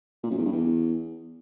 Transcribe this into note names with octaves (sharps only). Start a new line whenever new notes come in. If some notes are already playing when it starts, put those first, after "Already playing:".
A#2
F#2
E2
G2
E2